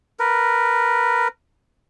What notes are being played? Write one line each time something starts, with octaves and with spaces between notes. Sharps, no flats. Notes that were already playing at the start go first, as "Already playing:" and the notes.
A#4 B4